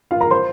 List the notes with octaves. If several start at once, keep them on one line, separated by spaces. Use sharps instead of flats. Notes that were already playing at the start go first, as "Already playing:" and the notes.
F4 F5
A#4 A#5
C5 C6